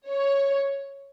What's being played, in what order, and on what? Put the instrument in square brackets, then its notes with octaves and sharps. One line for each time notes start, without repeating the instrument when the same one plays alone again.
[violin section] C#5